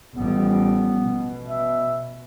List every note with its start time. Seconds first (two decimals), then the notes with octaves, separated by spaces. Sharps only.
0.15 A1 F3 G3 B3
0.99 B2
1.46 E5